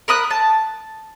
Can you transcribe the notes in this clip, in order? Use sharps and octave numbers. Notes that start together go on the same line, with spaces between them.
A#4 B5 D#6 F#6
A5